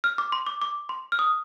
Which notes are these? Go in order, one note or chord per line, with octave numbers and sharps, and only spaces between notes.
F6
D6
C6
D6
D6
C6
F6
D#6